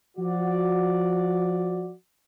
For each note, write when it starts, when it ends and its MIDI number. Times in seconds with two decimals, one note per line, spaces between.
0.17 1.92 53
0.17 1.92 66
0.17 1.92 74